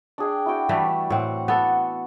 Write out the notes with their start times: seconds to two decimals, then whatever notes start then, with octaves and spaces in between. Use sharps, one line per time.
0.18 D4 G#4 G5
0.46 E4 F#4 G5
0.69 E3 G3 A3
0.86 D4
1.10 A2 C4 F#5
1.48 B3 A4